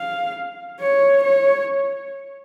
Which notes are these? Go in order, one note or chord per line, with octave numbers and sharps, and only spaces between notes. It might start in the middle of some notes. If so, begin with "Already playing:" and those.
Already playing: F5
C#5
C#5